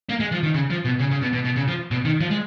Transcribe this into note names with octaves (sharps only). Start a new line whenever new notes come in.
A#3
G#3
F3
D#3
C#3
F3
B2
C#3
C#3
B2
B2
B2
C#3
F3
B2
D#3
F3
G#3